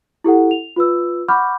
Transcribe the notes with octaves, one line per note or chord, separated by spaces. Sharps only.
E4 G4 A4 F#5
F7
F4 B4 E6
F#5 B5 C#6 D6 F6 G6